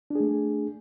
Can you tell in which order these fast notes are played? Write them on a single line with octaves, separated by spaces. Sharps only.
D4 G#4 A3